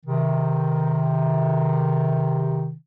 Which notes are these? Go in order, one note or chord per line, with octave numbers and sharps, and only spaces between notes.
C3 D#3